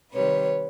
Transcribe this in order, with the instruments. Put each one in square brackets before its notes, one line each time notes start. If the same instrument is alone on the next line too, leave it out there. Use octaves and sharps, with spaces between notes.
[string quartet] C3 D#3 G3 B4 C#5